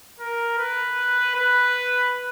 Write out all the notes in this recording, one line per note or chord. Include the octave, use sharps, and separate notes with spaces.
A#4
B4
B4